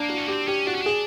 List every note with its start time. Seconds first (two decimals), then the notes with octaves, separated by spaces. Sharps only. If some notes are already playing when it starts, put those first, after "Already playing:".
Already playing: A#3 D4
0.09 F#4
0.18 C#4
0.28 C4 G4
0.48 C#4 G4
0.67 D4 F#4
0.75 C#4
0.82 D4 G#4